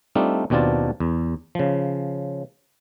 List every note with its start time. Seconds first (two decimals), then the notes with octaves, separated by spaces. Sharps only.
0.15 G3 A3 C4 D4 D#4 F4
0.50 D#2 B2 C4 D4 F4 A5
1.00 E2
1.55 C#3 F3